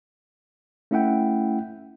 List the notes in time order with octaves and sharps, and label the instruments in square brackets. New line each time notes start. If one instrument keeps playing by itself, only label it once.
[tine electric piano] A3 C#4 E4 E5 F#5 G5